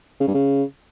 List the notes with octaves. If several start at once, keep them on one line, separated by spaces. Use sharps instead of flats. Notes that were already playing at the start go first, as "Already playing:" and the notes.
C#3
G2
C#3